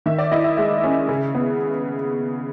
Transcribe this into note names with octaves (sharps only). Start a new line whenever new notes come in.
D#3 E5
D5
E4 D#5
E5
G#3 E5
C#4
C#3
B3